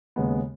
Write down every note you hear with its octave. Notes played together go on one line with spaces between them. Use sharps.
D#2 C#3 G#3 B3